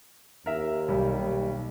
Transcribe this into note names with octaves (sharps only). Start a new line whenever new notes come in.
D#2 A#4 E5
B1 G3